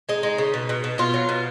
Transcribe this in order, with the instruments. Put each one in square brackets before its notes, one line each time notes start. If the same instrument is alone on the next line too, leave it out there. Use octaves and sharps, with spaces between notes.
[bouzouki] G#3 D#4
G#3
C#3
B2
B2
B2
B2 F4
F#3
B2